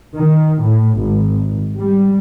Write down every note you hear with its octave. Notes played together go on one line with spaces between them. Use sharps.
D#3
A2
G#1
G3